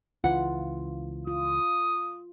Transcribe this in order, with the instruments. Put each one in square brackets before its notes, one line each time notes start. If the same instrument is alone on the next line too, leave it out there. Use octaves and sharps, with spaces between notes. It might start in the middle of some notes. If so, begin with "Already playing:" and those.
[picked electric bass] C#2 E3 [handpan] F4 [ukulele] F#5
[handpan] F4 [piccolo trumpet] D#6